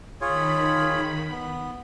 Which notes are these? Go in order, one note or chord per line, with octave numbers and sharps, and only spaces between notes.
D#3 F4 G#4 C#5 B5
B3